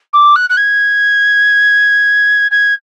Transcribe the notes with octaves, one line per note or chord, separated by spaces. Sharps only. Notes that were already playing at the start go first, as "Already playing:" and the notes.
D6
F#6
F#6
G#6
G#6